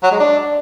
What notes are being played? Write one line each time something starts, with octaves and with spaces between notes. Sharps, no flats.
F#3
G#3
D4